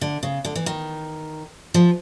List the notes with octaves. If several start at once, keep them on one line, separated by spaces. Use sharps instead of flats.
D3
C#3
D3
E3
D#3
F3